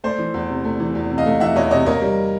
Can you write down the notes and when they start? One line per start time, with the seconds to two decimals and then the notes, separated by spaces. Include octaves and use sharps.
0.04 A3 C5 D5
0.18 E3
0.34 E2
0.49 C3
0.64 A3
0.80 E3
0.95 E2
1.10 C3
1.18 D#5 F5
1.26 A3
1.40 E3 E5 F#5
1.56 E2 C#5 D#5
1.71 C3 C#5 D#5
1.86 A#3 C#5 D#5
2.02 G3